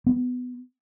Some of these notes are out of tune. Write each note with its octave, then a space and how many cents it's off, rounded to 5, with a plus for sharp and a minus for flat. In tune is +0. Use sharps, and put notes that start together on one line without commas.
B3 +15